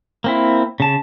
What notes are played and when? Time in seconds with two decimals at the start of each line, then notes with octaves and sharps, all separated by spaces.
0.24 A#3 C4 E4
0.80 C#3 A5